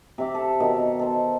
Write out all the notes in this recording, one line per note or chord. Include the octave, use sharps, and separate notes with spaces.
C3 E5 D6
A4
B2 D#3
A4 C5